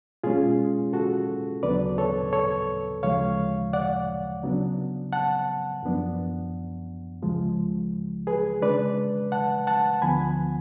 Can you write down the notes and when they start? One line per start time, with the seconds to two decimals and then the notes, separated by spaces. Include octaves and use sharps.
0.23 B2 G#3 C#4 F4 G#4
0.93 F#4 A4
1.63 D2 C#3 F#3 B3 D4 B4 D5
1.98 A4 C#5
2.32 A4 C#5
3.03 D2 C#3 F3 G#3 C#5 F5
3.73 D5 F#5
4.43 C#3 F#3 B3 D4
5.13 F#5 A5
5.83 F#2 F3 B3 D4
7.22 C#2 C#3 F3 G#3
8.27 G#4 B4
8.62 C#3 G#3 D4 B4 D5
9.32 F#5 A5
9.67 F#5 A5
10.02 D2 D3 F3 B3 G#5 B5